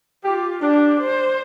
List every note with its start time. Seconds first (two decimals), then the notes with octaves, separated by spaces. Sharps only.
0.24 F4 G4
0.62 D4 G4
0.99 C5